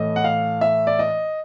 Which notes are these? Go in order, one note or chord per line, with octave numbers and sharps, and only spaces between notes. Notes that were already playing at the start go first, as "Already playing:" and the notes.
Already playing: A2 E3 A3 D#5
F#5
F5
E5
D5
D#5